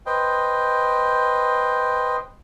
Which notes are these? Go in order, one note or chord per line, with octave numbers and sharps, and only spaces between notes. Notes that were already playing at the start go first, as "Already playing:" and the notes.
B4 C5 D#5 G5